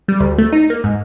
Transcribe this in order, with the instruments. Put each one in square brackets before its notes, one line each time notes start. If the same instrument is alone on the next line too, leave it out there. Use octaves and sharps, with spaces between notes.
[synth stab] G3
D2
A3
D#4
A#3
G#2